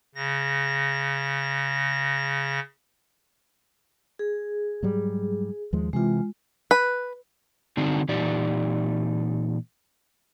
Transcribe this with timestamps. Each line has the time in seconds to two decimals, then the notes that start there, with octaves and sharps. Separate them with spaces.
0.15 C#3 A#6
4.19 G#4
4.83 G#2 F#3 G3
5.73 D#2 F3 G#3
5.93 C3 E3 G#3 F4
6.71 B4
7.77 D3 C4 D4 D#4 F#4
8.09 A#2 E3 D#4 G4 D5